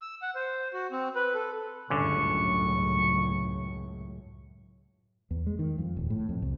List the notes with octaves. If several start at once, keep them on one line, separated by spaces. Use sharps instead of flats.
E6
F#5
C5
F#4
C4
B4
A4
G1 C#2 F#2 A2 D3 C#4 C#6
E2
G#3
D#3
F2
D#1
A2
F2
C2